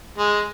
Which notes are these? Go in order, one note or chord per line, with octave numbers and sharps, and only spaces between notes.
G#3